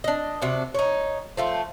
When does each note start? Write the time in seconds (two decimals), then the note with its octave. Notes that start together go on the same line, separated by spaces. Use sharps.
0.04 D4 D#5
0.42 C3 D4 F#4
0.74 D#4 C#5
1.37 F3 A3 F4